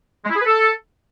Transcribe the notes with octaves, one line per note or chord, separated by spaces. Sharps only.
G#3
E4
G#4
B4
A4